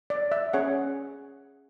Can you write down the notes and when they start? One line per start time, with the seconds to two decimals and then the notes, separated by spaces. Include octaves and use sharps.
0.10 D5
0.32 E5
0.53 C#4 G#4 C#5 F#5